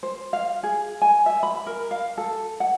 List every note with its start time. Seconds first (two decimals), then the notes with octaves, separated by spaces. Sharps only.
0.03 C5
0.33 F5
0.63 G#4
1.02 G#5
1.26 E5
1.43 B5
1.67 A#4
1.91 F5
2.18 A4
2.60 F#5